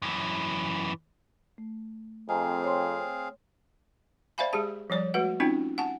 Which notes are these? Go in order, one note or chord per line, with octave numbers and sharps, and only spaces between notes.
F#2 E3
A3
F2 C4 G#4 D#5 F5 G#5 A#5
C#5 C6
C5 D5 E5 F5 G#5 B5
G#3 G4 G#4 A5
F3 G3 C#5 D5
G#3 A3 F#4 B4 F#5
C4 C#4 D#4 F4 G5
F#5 G#5 A5